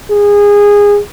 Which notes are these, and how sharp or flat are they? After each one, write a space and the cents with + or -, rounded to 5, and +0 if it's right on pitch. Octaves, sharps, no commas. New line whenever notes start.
G#4 -20